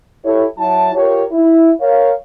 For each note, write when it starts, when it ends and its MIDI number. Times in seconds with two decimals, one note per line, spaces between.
0.25 0.45 64
0.25 0.45 67
0.25 0.45 69
0.25 0.45 73
0.59 0.91 54
0.59 0.91 64
0.59 0.91 81
0.95 1.24 65
0.95 1.24 67
0.95 1.24 70
0.95 1.24 73
1.32 1.71 64
1.81 2.12 70
1.81 2.12 73
1.81 2.12 77